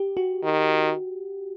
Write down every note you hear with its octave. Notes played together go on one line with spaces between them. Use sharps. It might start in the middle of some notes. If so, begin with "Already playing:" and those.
Already playing: G4
F#4
D#3